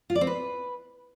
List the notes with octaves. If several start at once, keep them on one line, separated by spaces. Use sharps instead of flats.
F4
D5
C4
B4